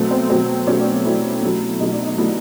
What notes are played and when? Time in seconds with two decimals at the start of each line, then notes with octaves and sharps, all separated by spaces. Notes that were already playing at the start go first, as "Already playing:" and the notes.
Already playing: B2 F#3 A3 C4
0.11 C4
0.30 B2 F#3 A3 C4
0.67 B2 F#3 A3 C#4
0.80 D4
1.05 B2 F#3 A3 E4
1.43 B2 F#3 A3
1.80 B2 F#3 A3 D#4
1.92 D4
2.05 D#4
2.18 B2 F#3 A3 E4